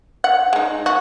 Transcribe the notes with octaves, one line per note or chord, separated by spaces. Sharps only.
F#5
G#3 D#4
F#4